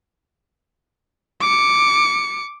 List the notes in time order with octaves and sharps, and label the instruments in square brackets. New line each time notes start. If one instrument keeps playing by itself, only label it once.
[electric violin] D6 C#7